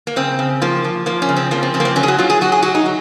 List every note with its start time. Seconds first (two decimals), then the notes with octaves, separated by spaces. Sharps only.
0.07 A#3
0.16 C#3 C4
0.39 C#3
0.62 F3 A#3
0.84 F3
1.06 F3 A#3
1.22 C#4
1.29 C#3
1.36 C4
1.51 F3 A#3
1.63 C4
1.74 C#3 C4
1.80 A#3
1.85 C4
1.96 F#3 C#4
2.03 G#4
2.08 F#4
2.18 F#3 F4
2.30 G#4
2.41 F#3 F#4
2.52 G#4
2.63 F#3 F#4
2.75 D#4
2.86 F#3